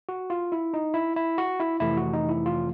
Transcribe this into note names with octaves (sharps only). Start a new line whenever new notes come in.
F#4
F4
E4
D#4
E4
E4
F#4
E4
F2 C3 E3 A3 E4
F#4
D#4
E4
F4